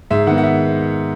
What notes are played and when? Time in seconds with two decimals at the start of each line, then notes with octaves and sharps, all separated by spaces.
0.11 G#2 E5
0.27 D#3 G#3 B3 F#5
0.38 F#5
0.43 E5